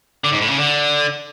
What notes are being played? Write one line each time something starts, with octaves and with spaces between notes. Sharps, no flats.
D3
G#2
A2
C#3
D3